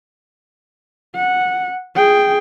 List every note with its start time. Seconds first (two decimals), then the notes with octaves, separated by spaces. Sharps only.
1.15 F#5
1.96 G#4 G5